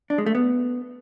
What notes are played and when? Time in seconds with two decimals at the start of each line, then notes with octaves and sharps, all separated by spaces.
0.10 D4
0.18 G#3
0.26 A3
0.35 B3